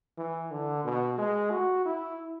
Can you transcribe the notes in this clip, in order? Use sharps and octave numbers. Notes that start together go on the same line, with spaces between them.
E3
D3
B2
G#3
F#4
E4